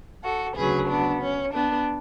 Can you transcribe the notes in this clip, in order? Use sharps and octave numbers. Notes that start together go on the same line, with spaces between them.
F#4 A4
D2 C#3 F#3 G#4 B4
B3 D4
C#4
B3 D4